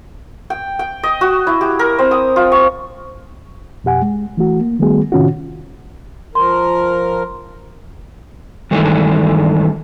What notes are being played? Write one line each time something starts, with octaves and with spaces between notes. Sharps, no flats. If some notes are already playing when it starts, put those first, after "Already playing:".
G5
G5
D#5
F#4
E4
G4
A#4
C4
D#6
F4
C#6
F2 B2 G4 F#5 G#5
G#3
E3 A3 F#4
A#3
D#3 G3 A3 B3 F#4 G#4
A2 C3 D#3 C#4 F4 F#4
F3 A#4 C6
G2 D#3 E3 G#3 A3